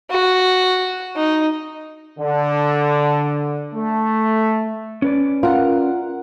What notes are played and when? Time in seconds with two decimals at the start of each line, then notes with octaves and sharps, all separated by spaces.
0.11 F#4
1.16 D#4
2.19 D3
3.74 A3
5.02 C#4 B4 D5
5.43 F4 A#4 F#5